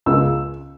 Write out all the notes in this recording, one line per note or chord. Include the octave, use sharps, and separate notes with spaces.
C#2 E6